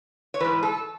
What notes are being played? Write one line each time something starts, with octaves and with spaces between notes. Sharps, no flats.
C#5
G#2 E3 B4
A4